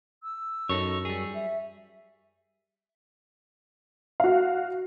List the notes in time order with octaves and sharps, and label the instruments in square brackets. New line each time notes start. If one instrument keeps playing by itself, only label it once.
[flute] E6
[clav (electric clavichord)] F#2 [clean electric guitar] D#4 A4 C#5
[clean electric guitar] G3 G#4
[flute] E5
[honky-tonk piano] F#4 F5